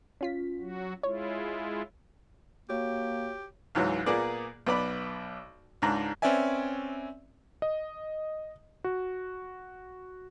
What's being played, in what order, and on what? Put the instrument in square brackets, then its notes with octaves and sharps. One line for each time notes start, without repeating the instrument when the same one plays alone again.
[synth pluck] C#4 F4 B6
[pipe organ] F#3 F#4
[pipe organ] G#3 E4 F4 [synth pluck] C#5
[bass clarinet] A#3 [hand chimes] F#4 C#5 [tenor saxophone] G4
[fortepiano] C#2 G#2 E3 F#3
A#2 A#3 B3 G#4 D5
B1 B3 D5 B5
C#2 G#2 D4 A#5
[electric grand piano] C4 C#4 B4 D5 E5 G#5
D#5
F#4